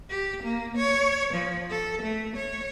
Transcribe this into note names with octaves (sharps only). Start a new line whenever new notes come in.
G4
A#3
C#5
F3
A4
A3
C#5